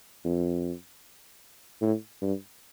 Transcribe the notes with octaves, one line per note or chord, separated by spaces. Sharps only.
F2
A2
G2